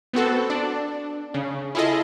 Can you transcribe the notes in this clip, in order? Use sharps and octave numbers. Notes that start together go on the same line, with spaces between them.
B3 C4 F#4 A4
D4
C#3
E4 F4 G#4 A4 D#5